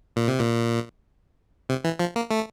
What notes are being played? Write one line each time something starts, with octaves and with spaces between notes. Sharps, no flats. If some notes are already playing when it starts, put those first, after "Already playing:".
A#2
C3
A#2
C3
E3
F3
A#3
A3